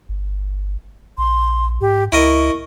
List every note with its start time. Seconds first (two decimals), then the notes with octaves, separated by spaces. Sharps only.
0.09 G1
1.18 A#1 C6
1.81 G#2 G4
2.12 C#2 E4 A#4 D#5 C#6